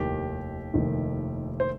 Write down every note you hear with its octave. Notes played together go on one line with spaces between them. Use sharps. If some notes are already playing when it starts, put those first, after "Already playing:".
Already playing: F1 D#2 D#3 G4
F1 D#2 D#3
C5